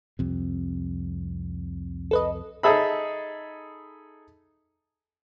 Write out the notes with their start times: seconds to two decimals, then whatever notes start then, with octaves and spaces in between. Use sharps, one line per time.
0.19 C2 F2 C3
2.11 A4 B4 D#5
2.63 D#4 G#4 A4 E5 B5